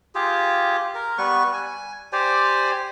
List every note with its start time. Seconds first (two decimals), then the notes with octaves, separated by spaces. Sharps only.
0.15 F4 G4 G#4
0.95 A#4
1.18 G3 B3 B4 C#6
1.53 G#5
2.12 G4 C5 D5 G#5